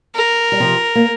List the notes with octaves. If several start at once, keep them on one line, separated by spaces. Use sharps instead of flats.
A#4
G3
C3 F3
A#3